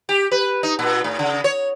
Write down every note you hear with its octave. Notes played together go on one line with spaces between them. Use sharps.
G4
B4
D#4
A#2
A2
C#3
C#5